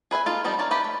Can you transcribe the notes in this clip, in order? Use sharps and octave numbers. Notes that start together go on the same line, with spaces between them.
G#4 B4 E5 G#5
A#3 D#4 F4 A4
F3 G3 C4 D#4
D#4 A#4 C#5 D5 A5
G4 B4 E5
A3